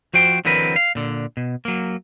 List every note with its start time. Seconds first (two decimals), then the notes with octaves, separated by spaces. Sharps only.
0.14 F3 F#4 C5 G5
0.45 D3 E3 F#3 C4 A#4 B4
0.76 F5
0.95 A#2 D3
1.37 B2
1.65 F#3 A#3